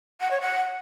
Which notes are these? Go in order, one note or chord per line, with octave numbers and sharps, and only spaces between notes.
F#5
C#5
F#5